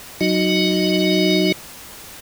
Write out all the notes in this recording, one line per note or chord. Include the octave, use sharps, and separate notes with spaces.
F#3 D#4 F#4 D#5